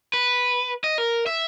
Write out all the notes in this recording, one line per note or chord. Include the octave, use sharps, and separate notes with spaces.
B4
D#5
A#4
E5